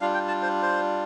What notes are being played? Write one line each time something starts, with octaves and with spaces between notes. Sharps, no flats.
G3 D4 F4 F5
G5
A5
C5
C5